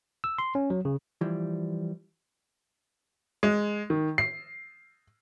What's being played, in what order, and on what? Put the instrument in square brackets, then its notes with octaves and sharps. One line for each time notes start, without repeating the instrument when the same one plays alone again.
[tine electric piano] E6
C6
C#4
F#3
C#3
[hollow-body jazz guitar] E3 F3 G3
[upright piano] G#3
D#3
C7